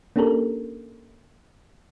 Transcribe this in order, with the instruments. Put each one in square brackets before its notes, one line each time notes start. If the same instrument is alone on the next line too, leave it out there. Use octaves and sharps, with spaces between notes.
[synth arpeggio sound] A#3 C#4 D4 G4 A4 A#4